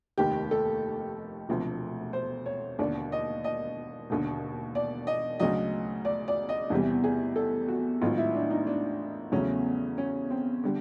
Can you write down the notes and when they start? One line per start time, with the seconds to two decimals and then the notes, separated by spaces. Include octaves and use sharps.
0.18 F1 D#2 D#3 G4
0.51 A4
1.49 E1 D2 C3 F3
2.13 C5
2.46 C#5
2.79 E1 D#2 D3 D5
3.12 D#5
3.44 D#5
4.10 E1 D#2 D3
4.75 D5
5.07 D#5
5.40 D2 C#3 F#3 D#5
6.05 D5
6.28 D5
6.49 D#5
6.70 E2 C3 E3 G3
7.04 G#4
7.36 A4
7.68 F#4
8.01 A1 G#2 D#3 F#3 F4
8.18 E4
8.35 D4
8.50 D#4
8.67 D4
9.32 E2 C#3 F#3 A3 C#4
9.98 C#4
10.30 C4
10.64 D3 G3